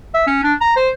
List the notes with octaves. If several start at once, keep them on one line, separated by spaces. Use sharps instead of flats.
E5
C#4
D4
A#5
C5